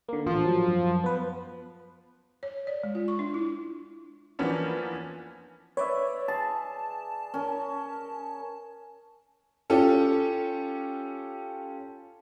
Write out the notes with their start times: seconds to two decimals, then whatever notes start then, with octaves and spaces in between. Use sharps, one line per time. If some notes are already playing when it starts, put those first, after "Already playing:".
0.09 D3 A#3
0.26 A1 F3
0.45 G#2 F#3
0.68 F#2
1.04 B3 B4
2.43 C#5
2.67 D5
2.83 G#3
2.95 F4
3.08 C#6
3.19 D4
3.34 E4
4.39 E3 F3 A#3 B3 C#4 D4
5.77 B4 C#5 D5 E5
6.28 G#4 A5
7.34 C#4 A#4
9.70 C#4 F4 G4 A4